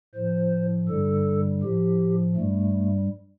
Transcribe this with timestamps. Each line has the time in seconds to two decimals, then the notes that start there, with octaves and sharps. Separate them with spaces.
0.14 A2 F3 C5
0.88 G2 D3 G3 A4
1.62 A2 F3 G4
2.37 G2 G3 A3